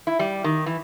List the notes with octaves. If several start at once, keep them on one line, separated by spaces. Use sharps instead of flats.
E4
G3
D#3
E3